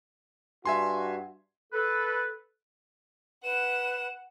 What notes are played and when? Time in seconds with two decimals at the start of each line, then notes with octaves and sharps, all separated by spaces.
0.65 G2 F#4 E5 G#5 C6
1.73 A4 B4
3.44 B4 F#5 E7